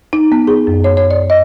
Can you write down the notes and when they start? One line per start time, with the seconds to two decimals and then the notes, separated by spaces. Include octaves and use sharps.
0.13 D#4
0.32 B3
0.47 G#4
0.67 F#2
0.84 C#5
0.97 C#5
1.11 D5
1.30 D#5